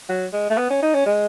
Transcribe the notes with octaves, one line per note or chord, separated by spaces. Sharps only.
F#3
G#3
A3
B3
C#4
D#4
C#4
G#3